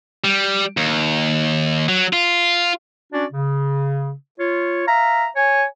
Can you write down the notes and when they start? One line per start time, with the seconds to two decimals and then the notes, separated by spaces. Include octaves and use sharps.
0.24 G3
0.77 D#2
1.88 F#3
2.13 F4
3.12 C#4 D4 F#4 D5
3.32 C#3
4.39 F4 C#5
4.87 E5 F5 A#5
5.36 C#5 G#5